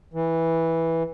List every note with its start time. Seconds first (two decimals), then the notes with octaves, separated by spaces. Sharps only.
0.13 E3